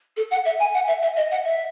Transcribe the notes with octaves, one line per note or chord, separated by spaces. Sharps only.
A4
F#5
E5
G#5
F#5
E5
E5
D#5
F#5
E5